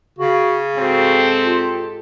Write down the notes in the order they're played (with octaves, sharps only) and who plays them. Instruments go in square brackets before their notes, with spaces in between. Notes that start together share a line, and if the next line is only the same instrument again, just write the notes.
[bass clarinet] C#3 [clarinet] F#4
[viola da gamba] G#2 G4 A4 [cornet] C4 [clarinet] F#4
[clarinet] F4